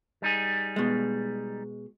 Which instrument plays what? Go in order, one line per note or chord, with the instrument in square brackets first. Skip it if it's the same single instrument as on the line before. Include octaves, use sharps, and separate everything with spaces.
[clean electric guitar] G3 D#4 G#4
[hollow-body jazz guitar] B2 G#3